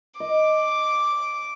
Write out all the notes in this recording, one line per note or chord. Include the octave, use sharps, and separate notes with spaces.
D#5 D6